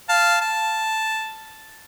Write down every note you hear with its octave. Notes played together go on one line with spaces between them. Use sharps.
F5 A5
A5